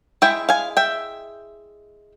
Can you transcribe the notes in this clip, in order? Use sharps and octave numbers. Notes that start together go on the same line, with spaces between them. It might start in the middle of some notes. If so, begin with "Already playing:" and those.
G#3 E4 E5 G5
F5 G#5
E5 G5